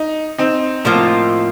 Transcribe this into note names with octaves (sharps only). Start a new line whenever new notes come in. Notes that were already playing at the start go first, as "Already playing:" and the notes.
Already playing: D#4
C4 D#4
A2 F3 A#3 F4